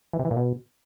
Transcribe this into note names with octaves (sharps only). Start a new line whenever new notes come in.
E3
C3
E3
A#2
B2